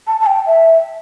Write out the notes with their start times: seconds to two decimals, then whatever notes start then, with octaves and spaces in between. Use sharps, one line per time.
0.07 A5
0.20 A5
0.26 G5
0.46 E5